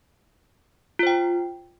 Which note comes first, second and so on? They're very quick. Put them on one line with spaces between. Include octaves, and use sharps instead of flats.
F4 C5 G5